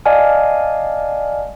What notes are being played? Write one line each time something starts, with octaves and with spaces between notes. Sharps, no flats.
D5 D#5 F5 G#5 A5 F6